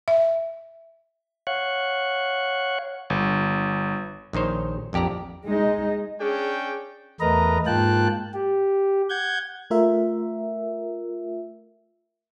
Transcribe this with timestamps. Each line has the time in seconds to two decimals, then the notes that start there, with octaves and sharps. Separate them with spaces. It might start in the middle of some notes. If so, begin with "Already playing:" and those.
0.08 E5
1.47 C#5 F5 F#5 C#6 F#6
3.10 G1
4.33 A#1 D#3 D#4 C5 C#5
4.93 A#1 F2 G4 D5 A#5
5.45 G#3 D#4
6.20 C#4 D4 G#4 G5
7.20 E2 A3 A#4 B4 D#5 A#5
7.66 G#2 A#3 F4 G5 A5 F#6
8.34 G4
9.10 F#5 G6 G#6
9.70 A3 F4 A#4 E5